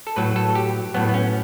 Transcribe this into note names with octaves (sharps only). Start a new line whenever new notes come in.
A4
A2 F#3 B4
A4
G4
A2 F#3 B3
B3
C#4